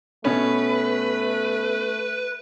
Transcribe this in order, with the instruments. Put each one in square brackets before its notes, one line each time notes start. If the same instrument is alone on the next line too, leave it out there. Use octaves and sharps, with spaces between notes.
[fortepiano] B2 B3 C#4 [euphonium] A3 [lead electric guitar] B4